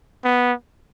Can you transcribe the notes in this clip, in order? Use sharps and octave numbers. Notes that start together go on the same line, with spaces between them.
B3